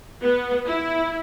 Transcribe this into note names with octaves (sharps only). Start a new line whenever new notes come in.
B3
E4